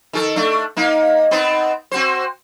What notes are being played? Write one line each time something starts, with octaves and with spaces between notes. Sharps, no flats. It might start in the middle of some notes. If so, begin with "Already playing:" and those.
D#3 G#4 A4
A3 D4
A#3 D#4
B3 C4 D#4
C4 F#4 C5